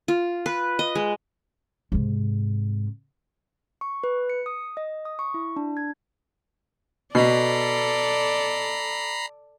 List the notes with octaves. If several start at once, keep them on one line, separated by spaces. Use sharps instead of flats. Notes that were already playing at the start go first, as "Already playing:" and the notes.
F4
B4
D#5
G#3
G#2 C3
C#6
B4
C#7
D#6
D#5
D#6
C#6
E4
D4
G#6
B2 A4 D5 A#5 B5 C7